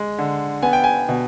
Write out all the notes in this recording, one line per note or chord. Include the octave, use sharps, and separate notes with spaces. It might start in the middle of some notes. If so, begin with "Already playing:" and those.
Already playing: G#3
D3
B3 G#5
G5
G#5
B2